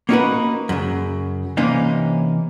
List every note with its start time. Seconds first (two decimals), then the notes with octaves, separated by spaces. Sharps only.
0.09 A#3 C#4 D#4 F#4 A#4 B4
0.69 F#2 C#3
1.57 C3 E3 A#3 C#4 D#4